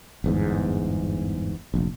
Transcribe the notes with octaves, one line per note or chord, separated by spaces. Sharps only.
G1 E2 G#2
F1 A#1